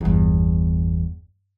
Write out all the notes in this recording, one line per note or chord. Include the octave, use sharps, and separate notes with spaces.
G1 E2